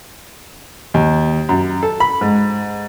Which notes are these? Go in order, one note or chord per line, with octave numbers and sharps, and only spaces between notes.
D#2
F#2
A4
B5
G#2